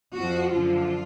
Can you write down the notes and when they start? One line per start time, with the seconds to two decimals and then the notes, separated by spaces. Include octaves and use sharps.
0.16 F2 F3 F#4
0.53 F#2 D3 F3 F4